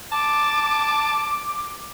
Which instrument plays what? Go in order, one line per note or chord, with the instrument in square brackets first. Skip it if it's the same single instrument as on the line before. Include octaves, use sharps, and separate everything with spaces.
[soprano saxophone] A5 [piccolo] D6